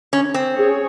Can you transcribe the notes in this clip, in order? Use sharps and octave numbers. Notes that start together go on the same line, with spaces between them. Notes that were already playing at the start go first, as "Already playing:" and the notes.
C#4
C4
C#4 G#4 C#5